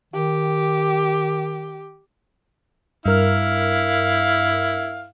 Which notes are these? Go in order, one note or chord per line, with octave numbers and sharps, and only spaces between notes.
D#3 G4
G2 E4 A#4 F5 F6